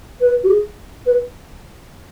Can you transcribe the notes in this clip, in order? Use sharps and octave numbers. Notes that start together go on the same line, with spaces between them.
B4
F#4
G#4
B4